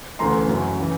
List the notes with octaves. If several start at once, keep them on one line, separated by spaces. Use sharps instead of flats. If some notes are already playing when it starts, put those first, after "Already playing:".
D2 C#3 E3 A3 A#5 C6
F#2 C#3 F#3
C#3 E3